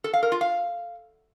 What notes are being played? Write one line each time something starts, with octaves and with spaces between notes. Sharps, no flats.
A4
F5
A#4
F4
F5